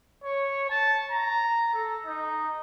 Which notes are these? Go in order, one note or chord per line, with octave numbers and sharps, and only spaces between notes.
C#5
A5
A#5
A4
D#4